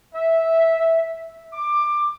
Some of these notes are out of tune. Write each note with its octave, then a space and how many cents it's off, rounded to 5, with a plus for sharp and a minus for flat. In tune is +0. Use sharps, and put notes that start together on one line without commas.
E5 -10
D6 +15